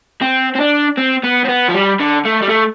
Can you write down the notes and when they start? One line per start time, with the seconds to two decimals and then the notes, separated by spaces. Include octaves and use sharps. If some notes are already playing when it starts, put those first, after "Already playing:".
0.22 C4
0.55 C4
0.60 D4
0.97 C4
1.23 B3
1.45 C4
1.48 B3
1.69 F3
1.74 G3
2.00 D3
2.25 A3
2.42 G3
2.49 A3